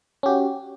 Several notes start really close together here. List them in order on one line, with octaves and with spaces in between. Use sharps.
C#4 G4 F#4